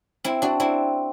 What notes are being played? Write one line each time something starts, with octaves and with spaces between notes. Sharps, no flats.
C4 E4
D4 F#4
C4 E4